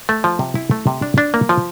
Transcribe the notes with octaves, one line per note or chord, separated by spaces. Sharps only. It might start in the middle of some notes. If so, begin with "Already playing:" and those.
A3
F3
C3
E4
A3
C3
D4
D4
A#3
F3